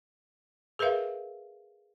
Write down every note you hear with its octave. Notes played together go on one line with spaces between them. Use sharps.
G#4 A#4 B4 E5 F5